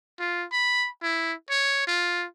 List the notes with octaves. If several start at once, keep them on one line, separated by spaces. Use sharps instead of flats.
F4
B5
E4
C#5
F4